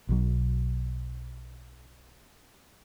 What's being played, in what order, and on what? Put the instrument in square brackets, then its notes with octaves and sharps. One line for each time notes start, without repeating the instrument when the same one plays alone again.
[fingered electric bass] B1 F#3